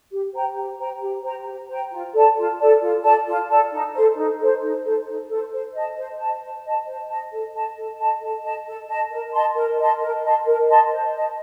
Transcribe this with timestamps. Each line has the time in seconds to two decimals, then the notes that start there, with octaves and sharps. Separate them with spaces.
0.11 G4
0.34 C5 G5 A#5
0.56 G4
0.79 C5 G5 A#5
1.01 G4
1.23 C5 G5 A#5
1.46 G4
1.69 C5 G5 A#5
1.91 F4
2.14 A4 D5 A5
2.36 F4
2.59 A4 D5 A5
2.81 F4
3.03 A4 D5 A5
3.27 F4
3.49 A4 D5 A5
3.71 D#4
3.94 A4 C5
4.16 D#4
4.39 A4 C5
4.61 D#4
4.84 A4 C5
5.06 D#4
5.29 A4 C5
5.51 C5
5.74 D#5 A5
5.96 C5
6.18 D#5 A5
6.41 C5
6.64 D#5 A5
6.86 C5
7.09 D#5 A5
7.32 A4
7.54 D#5 A5
7.76 A4
7.99 D#5 A5
8.21 A4
8.43 D#5 A5
8.66 A4
8.89 D#5 A5
9.11 A#4
9.34 D#5 A5 C6
9.56 A#4
9.79 D#5 A5 C6
10.01 A#4
10.24 D#5 A5 C6
10.47 A#4
10.68 D#5 A5 C6
10.91 C5
11.14 D#5 A5